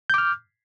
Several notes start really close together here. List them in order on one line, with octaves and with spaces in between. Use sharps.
G6 D6 F6